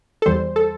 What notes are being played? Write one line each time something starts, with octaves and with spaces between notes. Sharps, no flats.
A4
E2 E3 G3 C5
A4